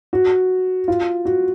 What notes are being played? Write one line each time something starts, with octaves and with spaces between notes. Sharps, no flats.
F#4
F4
F#4